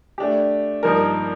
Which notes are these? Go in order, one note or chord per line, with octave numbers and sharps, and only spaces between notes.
A3 D4 G4
G2 F3 A#3 D#4 A#4